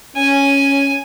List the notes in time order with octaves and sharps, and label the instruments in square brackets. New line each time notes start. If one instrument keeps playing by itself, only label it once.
[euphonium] C#4 [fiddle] G#5